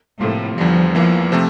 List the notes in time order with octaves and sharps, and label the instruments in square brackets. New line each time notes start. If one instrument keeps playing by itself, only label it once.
[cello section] A2 [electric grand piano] C3 F3 A#3 F4
[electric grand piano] E2 D3 G3 [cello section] F3
[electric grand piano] E2 E3 A#3 [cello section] F3
[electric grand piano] C3 F3 A3 C4